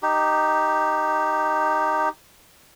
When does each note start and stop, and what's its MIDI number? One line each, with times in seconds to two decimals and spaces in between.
0.03 2.09 63
0.03 2.09 67